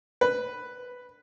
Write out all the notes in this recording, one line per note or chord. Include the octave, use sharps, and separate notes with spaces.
B4